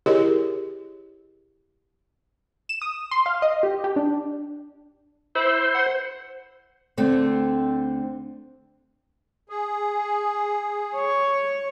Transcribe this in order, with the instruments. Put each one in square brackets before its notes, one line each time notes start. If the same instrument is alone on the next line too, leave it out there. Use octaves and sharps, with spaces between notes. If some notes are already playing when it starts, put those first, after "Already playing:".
[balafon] E4 G4 G#4 A#4 C#5 D#5
[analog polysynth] E7
D#6
C6
F5
D#5
G4
G4
D4
[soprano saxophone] E4 [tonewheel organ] C5
[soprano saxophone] F#5
[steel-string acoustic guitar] D2 D3 A3 C4
[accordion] G#4
[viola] C#5